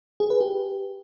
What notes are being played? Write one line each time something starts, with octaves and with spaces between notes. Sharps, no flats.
G#4
B4
G4